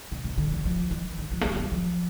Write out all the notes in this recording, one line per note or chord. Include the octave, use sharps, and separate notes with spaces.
C3
C3
D3
F3
F3
E3
D3
F3
A3
G3
F3
G3
F3